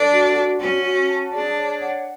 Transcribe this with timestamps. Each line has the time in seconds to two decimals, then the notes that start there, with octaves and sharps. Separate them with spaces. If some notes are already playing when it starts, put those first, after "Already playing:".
Already playing: D4 A4
0.12 F#4
0.36 F#4
0.61 C#4 F#4
0.84 F#4
1.09 A5
1.33 D4 G#4
1.57 C#5
1.82 F#5